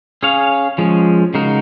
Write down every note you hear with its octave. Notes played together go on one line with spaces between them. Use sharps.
C#4 G#4 C#5 F5
F3 G#3 C#4
C#3 G#3 D#4 F#4 A#4